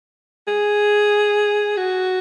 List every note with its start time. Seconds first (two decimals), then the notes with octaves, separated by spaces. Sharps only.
0.47 G#4
1.77 F#4